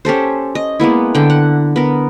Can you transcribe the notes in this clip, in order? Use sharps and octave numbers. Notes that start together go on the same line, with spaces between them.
C#4 G4 A4 C5
D#5
G#3 A#3 B3 E4
D3 G5
F#5
B3 A#4